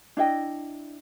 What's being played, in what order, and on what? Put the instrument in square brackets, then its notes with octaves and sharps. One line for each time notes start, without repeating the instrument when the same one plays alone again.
[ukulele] D4 E4 D#5 G5